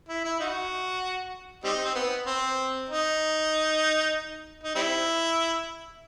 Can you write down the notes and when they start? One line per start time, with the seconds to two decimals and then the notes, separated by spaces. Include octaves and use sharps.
0.09 E4
0.24 E4
0.40 D#4 F#4
1.64 G3 C4 D#4
1.84 C4
1.95 B3
2.26 C4
2.89 D#4
4.64 D#4
4.76 G3 C4 E4